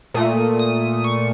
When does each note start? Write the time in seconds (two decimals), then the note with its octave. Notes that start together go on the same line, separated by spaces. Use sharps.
0.14 A#2 A3 D#6
0.59 D#6
1.04 C#6